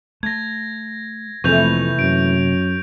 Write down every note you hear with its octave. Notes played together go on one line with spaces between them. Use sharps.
A3 G#6 A#6
F2 C3 E3 A3 A#3 C#6 G6 F7
F#2 D7